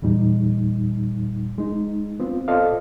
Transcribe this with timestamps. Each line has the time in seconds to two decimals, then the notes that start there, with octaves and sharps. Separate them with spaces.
0.02 E2 A#2 G3 D#4
1.58 G#3 D#4
2.20 B3 C4 F4
2.48 F4 A4 C5 D5 D#5 F5